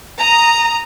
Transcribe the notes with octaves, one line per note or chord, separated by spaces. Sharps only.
A#5 D#6